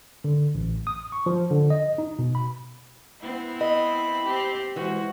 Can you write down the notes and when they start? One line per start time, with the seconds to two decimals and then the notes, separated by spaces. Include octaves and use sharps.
0.24 D3
0.55 A1
0.87 D#6
1.12 C#6
1.26 F3
1.51 D3
1.70 D#5
1.98 D#4
2.19 B2
2.35 B5
3.20 B3 C4 E4
3.61 D#5 B5
4.25 C4 G4
4.76 E3 G#3 F#4 C5